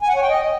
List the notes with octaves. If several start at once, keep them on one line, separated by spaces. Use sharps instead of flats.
G#5
F#5
C#5
G5
D#5